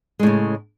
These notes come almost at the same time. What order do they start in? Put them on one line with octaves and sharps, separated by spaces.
G#3 A2 C#3